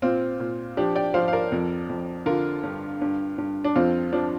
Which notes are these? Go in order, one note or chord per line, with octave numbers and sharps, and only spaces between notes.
A#2 C4 F4
A#2
F3 D4 G4
D5 G5
F3 C5 F5
F5
A#4 D5
F2
F2
D3 F4 A#4
G2
G2
G2
D4
F2 C4 F4
F3 D4